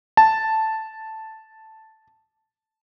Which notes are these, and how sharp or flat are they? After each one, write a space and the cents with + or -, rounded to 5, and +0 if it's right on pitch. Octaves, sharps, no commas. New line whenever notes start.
A5 +0